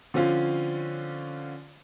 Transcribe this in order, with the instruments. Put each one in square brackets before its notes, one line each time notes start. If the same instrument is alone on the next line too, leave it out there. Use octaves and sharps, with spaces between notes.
[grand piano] D3 F3 C4 C#4 F4